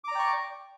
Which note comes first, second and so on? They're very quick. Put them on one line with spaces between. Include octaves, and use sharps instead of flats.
D6 A#5 D5 G5 C#6